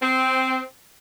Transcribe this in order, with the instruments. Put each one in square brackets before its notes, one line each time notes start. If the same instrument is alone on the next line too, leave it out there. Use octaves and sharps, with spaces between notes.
[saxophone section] C4